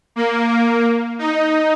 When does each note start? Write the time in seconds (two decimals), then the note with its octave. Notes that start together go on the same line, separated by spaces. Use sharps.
0.16 A#3
0.49 A#3
1.19 D#4